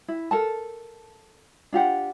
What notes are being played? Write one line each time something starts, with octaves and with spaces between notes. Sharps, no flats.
E4
A4 A#4 A5
D4 F4 G4 F#5